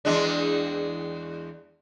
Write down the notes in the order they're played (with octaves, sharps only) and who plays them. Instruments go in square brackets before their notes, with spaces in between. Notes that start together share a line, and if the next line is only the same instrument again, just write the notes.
[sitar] E2 G#3 D4